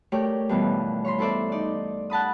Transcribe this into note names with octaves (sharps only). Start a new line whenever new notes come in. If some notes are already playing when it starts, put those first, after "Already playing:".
A3 G4 A#4 C#5 D5
G2 B2 E3 F3
C#5 B5 C6
E4 A4 C5 D5 E5
D#4 D5
F#5 A5 B5 D#6